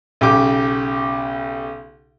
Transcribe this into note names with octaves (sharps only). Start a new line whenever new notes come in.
B1 C#3 G4 D6